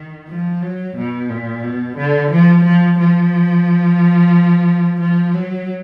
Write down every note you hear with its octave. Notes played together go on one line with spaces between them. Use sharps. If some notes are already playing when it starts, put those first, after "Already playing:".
Already playing: D#3
F3
F#3
B2
A#2
B2
D3
F3
F3
F3
F3
F#3